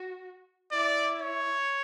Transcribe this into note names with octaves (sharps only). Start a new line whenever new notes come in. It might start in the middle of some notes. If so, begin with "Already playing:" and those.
Already playing: F#4
E4 D5
C#5